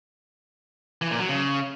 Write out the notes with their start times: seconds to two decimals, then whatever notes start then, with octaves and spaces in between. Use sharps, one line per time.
1.02 E3
1.11 A#2
1.20 F#3
1.29 C#3